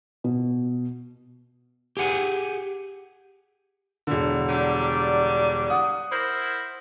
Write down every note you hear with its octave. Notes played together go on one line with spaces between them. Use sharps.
B2
G4 G#4 F#5 G#5
E1 D3
F#3 G3 D4
F#5 D#6
E4 A#4 C5